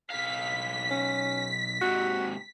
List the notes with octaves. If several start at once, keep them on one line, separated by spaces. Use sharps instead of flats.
B1 F5 B6
C#4
G#2 C3 F#4